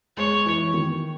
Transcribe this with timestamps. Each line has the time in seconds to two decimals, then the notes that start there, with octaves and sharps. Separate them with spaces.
0.17 G#3 C#5
0.46 E3
0.74 D#3